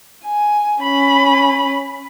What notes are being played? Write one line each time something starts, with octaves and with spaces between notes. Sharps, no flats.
G#5
C#4 B5